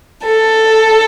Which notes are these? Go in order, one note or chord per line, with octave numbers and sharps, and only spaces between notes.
A4